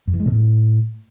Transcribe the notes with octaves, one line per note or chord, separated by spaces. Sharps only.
F#2
E3
G#3
B2
A2